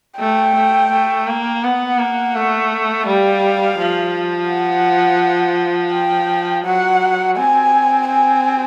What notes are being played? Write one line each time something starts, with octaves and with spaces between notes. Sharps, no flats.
A3 G5
A3
A3
A#3
B3 F#5
A#3
A3
G3 F5
F3
F#5
G5
F#3 F#5
C4 G#5
G#5